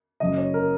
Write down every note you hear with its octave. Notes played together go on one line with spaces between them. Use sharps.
F#1 F#2 C#3 D#5
C#5
A#4